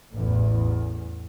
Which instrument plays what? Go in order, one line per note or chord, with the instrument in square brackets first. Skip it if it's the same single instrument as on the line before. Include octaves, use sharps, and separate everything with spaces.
[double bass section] A1 E2